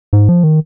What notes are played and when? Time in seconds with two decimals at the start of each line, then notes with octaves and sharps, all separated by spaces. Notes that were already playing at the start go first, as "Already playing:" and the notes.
0.13 G#2
0.29 F3
0.44 D#3